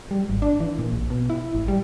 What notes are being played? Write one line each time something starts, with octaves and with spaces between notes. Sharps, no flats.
G3
G#1
D4
E3
A#2
A#1
B2
E4
A1
G3